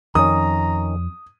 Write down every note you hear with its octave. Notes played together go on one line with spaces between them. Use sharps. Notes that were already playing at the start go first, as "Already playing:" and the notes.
F2 D#3 C#4 A#5 D#6